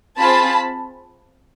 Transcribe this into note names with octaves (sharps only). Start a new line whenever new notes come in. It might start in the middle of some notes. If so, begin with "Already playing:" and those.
C4 F4 G#4 A5 B5